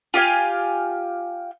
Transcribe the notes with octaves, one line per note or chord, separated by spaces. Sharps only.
F4 G4 F5 G#5